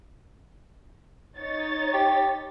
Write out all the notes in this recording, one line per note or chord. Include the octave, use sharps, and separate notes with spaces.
D#4 C#5 A6
G4